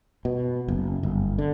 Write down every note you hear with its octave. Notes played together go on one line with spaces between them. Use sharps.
B2
F#1
G1
D3